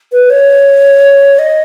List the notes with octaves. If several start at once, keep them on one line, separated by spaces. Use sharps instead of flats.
B4
C#5
D#5